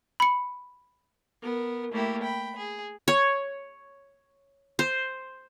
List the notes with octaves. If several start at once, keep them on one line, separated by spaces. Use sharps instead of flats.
B5 C#7
B3 A#4
A3 A#3 E4 G4
G5 B5
G#4
C#5
C5